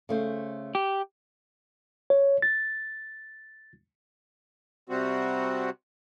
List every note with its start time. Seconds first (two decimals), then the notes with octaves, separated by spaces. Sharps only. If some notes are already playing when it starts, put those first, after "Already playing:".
0.09 C#3 A3 C5
0.75 G4
2.10 C#5
2.42 A6
4.89 C3 G3 C4 F#4